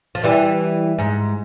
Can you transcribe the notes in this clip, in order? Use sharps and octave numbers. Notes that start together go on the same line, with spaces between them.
F3
E3 G3
G#2